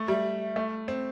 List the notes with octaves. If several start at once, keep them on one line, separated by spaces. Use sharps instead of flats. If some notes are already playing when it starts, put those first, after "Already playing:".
Already playing: A3
G3 E5
A3
C4